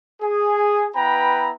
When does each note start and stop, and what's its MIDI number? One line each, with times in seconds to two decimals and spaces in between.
0.22 0.88 68
0.95 1.52 59
0.95 1.52 64
0.95 1.52 71
0.95 1.52 79
0.95 1.52 82
0.95 1.52 83